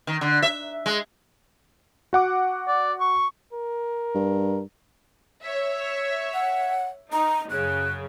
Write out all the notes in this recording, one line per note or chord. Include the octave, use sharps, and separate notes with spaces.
D#3
D3
E5
G#3
F#4 F#5 D6
D5
C#6
A#4
G2
C#5 E5
F#5
D#4 A#5
F#2 C#3 F#6